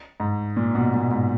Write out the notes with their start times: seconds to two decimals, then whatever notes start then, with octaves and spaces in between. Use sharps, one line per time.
0.20 G#2
0.57 A#2
0.75 B2
0.94 A#2
1.11 G#2